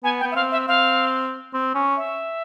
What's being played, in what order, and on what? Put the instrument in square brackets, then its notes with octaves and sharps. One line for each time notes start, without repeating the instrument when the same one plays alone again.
[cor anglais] B3 [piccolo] G#5
[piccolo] G5
[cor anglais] B3
[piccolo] E5
[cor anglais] C4 [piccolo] F5
[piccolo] E5
[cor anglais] C4 [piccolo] F5
[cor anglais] C4
C#4
[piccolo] E5